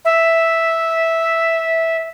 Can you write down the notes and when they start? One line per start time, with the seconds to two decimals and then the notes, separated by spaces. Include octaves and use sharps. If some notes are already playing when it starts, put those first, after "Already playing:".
0.05 E5